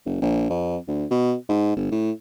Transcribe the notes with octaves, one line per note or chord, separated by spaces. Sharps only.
F#1
A#1
F2
D2
B2
G#2
G1
A2